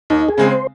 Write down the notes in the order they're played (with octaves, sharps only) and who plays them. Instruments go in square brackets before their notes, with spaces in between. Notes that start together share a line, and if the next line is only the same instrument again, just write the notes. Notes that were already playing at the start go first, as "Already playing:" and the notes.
[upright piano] D#2 [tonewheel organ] D#4
[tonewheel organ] G#4
[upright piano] C#3 G#3 C4
[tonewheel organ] C5